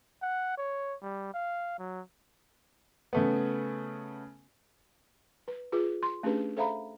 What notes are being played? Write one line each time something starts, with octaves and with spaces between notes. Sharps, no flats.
F#5
C#5
G3
F5
F#3
C#3 A3 B3
B4
F4 G#4 B4 D6
C6
A3 C#4 D4 G4 G#4 B4
A4 C5 E5 F5 A#5 B5